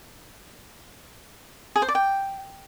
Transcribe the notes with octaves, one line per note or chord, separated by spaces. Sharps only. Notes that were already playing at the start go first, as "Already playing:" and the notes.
G#4
C5
D5
G5